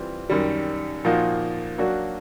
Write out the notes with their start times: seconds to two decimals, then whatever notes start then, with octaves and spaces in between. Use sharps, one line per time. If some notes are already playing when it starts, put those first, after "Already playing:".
Already playing: E3 G3 C4 F4
0.30 F#2 D#3 G3
1.05 A#2 F3 A#3 D#4 F#4
1.78 F#3 A#3 D4 F#4